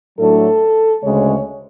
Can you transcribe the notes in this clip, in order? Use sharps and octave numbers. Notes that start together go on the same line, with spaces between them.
A2 F#3 A3 D4 A4
D2 C#3 G#3 C#5